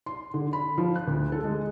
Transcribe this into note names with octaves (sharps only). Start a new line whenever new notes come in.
C6
D3
B5
F3
F#6
D2
A4
G#3